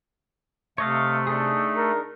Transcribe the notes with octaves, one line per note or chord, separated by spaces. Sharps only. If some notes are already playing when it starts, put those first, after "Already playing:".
C3 A3 C#5 D#5 F5
D4 D#4 G#4
A#4